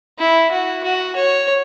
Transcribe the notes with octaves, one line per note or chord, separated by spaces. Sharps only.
E4
F#4
F#4
C#5